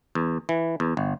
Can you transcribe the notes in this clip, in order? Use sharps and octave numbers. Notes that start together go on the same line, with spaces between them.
E2
E3
E2
G1